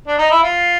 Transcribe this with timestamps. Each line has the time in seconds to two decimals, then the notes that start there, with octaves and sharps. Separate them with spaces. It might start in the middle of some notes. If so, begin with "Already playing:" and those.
0.07 D4
0.18 D#4
0.31 E4
0.43 F4